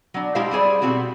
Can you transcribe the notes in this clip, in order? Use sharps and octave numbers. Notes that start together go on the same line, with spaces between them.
F#3 D4
G#3 E4 G4 A4 C5 F5
G3 E4 G#4 C5 D5
B2 B3 C4 F#4 G4